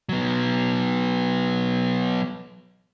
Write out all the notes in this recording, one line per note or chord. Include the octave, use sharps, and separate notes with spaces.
F#3 B3